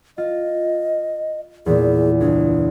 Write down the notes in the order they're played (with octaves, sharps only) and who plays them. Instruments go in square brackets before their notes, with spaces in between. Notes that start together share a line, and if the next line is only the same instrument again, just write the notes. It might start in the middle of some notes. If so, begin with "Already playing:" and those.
[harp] F4 [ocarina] D#5
[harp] E2 A#2 [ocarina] G#4
[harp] C#2 [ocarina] D4